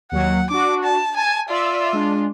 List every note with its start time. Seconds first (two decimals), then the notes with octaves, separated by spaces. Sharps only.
0.12 D#2 F#3 F#5
0.50 D4 F#4 D6
0.84 A5
1.17 G#5 A5
1.49 F4 D5 E5 E6
1.93 G#3 D4